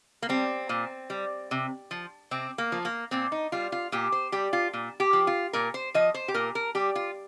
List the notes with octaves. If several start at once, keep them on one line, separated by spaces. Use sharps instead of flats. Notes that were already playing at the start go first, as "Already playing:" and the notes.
A#3
G3 C4
A#2
G3
C3
F3
C3 C4
A#3
F3
A#3
A#2 C4
D#4
G3 F4
F4
A#2 G4
C5
G3 G4
F4
A#2
G4
F3
F4
A#2 A#4
C5
F3 D#5
C5
G4
A#2 A#4
A#4
G3 G4
F4